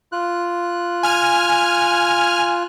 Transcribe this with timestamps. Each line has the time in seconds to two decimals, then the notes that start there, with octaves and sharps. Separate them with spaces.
0.12 F4 F#6
1.03 G#5 F6